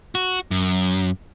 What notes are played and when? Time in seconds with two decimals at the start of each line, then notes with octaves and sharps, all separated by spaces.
0.15 F#4
0.51 F#2